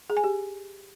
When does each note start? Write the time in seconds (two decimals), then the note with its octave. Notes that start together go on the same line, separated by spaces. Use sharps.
0.10 G#4
0.17 G#5
0.24 G4